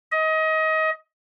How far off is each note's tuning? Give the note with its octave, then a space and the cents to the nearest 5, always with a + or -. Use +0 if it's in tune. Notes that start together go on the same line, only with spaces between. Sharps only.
D#5 +25